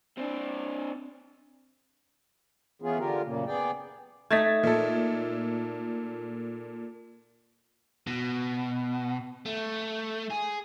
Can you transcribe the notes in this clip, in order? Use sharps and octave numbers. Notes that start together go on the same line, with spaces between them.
C4 D4
E3 B3 C#4 F4 G#4
D3 F4 G4 A#4
F#2 A#2 C#3 A#3
B3 G#4 D5 G5
A3 D#4 G#6 A6 B6
A#2 A4
B2
A3
G#4